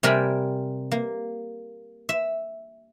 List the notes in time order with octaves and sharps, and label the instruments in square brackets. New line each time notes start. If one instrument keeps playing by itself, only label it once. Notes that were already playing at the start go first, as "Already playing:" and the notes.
[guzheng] C3 G3 A#4 D5 G#5 B5
A#3
E5